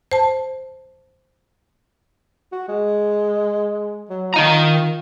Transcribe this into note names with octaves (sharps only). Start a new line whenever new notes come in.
C5 A5
F#4
G#3
F#3
D#3 F4 D#5 A#5